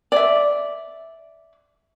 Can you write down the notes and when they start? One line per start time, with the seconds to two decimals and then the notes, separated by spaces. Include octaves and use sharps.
0.12 D5 E5